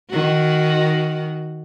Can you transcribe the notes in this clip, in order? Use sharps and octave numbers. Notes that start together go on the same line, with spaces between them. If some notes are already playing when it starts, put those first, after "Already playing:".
D#3 F#4